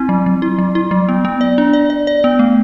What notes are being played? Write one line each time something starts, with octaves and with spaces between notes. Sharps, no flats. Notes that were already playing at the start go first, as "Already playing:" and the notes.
Already playing: C4 E4
F#3
F#3
E4
F#3
E4
F#3
B3
B3
D5
D4
D5
D5
D5
B3
A3